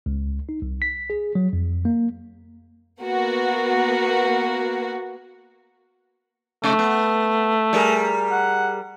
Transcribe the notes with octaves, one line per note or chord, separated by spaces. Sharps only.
C#2
D#4
C2
B6
G#4
F#3
F2
A#3
A#3 B3 F#4
C3 A3
B3
G3 G#4 A#4
F#5